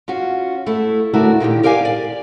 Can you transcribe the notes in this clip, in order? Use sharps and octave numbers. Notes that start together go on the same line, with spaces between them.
C#4 F4 F#4
A3 E4
D#2 D3 A3 E4 F#4 A#4
A#2 D#3 D4 G4
G4 A#4 D5 F5 G#5
D5